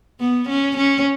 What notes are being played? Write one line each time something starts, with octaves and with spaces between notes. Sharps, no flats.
B3
C#4
C#4